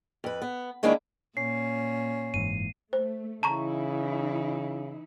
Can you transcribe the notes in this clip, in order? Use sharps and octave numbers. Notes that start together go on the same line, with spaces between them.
F2 B4
B3
D#3 G#3 A#3 C#4 D4 E4
A#2 C#4 C7
F#1 G#2 E3 D#7
A3 C5
C#3 E3 D#4 E4 A5 A#5 C#6